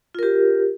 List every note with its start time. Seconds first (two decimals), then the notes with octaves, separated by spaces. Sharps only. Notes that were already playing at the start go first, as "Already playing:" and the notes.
0.15 F4
0.19 A#4
0.23 G4